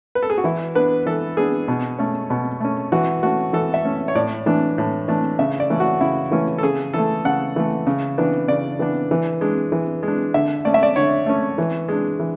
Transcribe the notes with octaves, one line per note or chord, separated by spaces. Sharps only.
B4
A4
G#4
F#4
E3 E4
B3 D4 B4
E3 A4
B3 D4 G#4
B2
A3 C#4
B2
A3 C#4
E3 F#4
A3 C#4 F#4
E3 A4
E5
A3 C#4
C#5
A2 D5
E3 A3 D4
A2
E3 A3 D4
C#3 E5
D5
E3 A3 C#4
F#4
C#3 E4
E3 A3 C#4
A4
C#3 G#4
E3 A3 A4
C#3 F#5
E3 A3
C#3
E3 B3 D4
C#3 D5
E3 B3 D4
E3
G#3 D4
E3
G#3
D4
D3 E5
A3 C#4 D5
E5
D5
D3 C#5
A3 C#4
E3
G#3 D4
E3